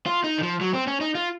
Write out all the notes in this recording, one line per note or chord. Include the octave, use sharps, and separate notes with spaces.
F4
D#4
D#3
F3
F#3
C4
C#4
D#4
F4